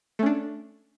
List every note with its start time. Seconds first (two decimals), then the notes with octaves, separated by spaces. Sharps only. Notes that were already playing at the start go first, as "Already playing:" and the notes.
0.19 A3
0.23 C#4
0.26 D4